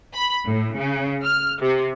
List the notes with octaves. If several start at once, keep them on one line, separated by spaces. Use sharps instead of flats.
B5
A2
C#3
F6
C3